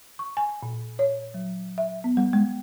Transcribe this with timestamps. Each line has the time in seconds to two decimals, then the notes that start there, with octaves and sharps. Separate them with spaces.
0.19 C#6
0.37 G#5
0.63 A#2
0.99 C#5
1.34 F#3
1.78 E5
2.04 B3
2.17 G3
2.33 G#3